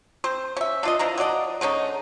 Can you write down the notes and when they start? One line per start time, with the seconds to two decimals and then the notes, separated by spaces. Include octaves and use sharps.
0.24 C4 C5
0.57 C#4 E5
0.83 D4 F4 D#5
0.99 E3 F3 D4 A#5
1.18 F#3 D#4 D5 D#5
1.61 D3 G#3 C#4 D#4